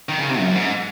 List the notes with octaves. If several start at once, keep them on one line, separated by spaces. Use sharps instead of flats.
D#3
C#3
C3
F#2
G#2